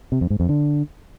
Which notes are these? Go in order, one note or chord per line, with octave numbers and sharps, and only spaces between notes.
C3
F2
G#2
F2
D3